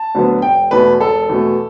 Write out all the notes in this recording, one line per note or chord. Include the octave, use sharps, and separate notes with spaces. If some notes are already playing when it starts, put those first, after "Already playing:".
Already playing: A5
D2 D3 F#3 B3
E1 G5
E2 B2 A3 B4
E1 A4
E2 B2 A3